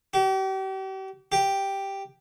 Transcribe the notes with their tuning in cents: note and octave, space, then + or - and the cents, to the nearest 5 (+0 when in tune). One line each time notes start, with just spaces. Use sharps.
G4 -40
G4 +0